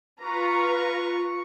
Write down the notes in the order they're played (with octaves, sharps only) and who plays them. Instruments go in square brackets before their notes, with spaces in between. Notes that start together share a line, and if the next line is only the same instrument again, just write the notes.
[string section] F4 B4 A#5 [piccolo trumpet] C#6